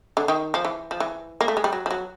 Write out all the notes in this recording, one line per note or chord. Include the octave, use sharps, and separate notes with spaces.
D3
D#3
F3
E3
F3
E3
A#3
A3
G#3
G3
F#3
F3
F#3